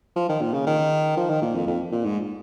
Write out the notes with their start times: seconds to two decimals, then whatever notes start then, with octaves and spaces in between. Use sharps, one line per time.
0.16 F3
0.29 D#3
0.41 A#2
0.54 C#3
0.67 D#3
1.17 F3
1.30 D#3
1.42 A#2
1.55 F2
1.67 F2
1.92 A#2
2.05 G#2